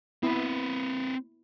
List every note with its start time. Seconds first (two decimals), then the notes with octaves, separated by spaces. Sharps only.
0.23 B3 C4 E4 B4